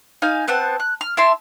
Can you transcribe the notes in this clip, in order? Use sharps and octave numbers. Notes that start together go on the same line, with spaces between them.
D#4 F5 G#5
B3 C4 F#5 A5
F#6
F6
E4 E5 A5 C6